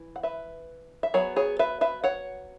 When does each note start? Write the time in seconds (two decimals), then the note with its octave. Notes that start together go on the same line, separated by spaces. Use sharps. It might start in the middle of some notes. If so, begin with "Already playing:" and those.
Already playing: E3
0.16 F#5
0.23 B4 E5
1.03 E5
1.14 F#3 B3 G#4 C#5
1.36 G#4 C#5
1.59 B4 E5
1.81 B4 E5
2.04 C#5 F#5